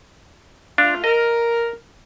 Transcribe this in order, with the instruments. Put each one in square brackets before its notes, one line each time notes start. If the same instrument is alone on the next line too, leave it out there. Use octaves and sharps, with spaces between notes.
[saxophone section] A3 F4 [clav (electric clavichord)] D4
[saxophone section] A#4 [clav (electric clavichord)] D#5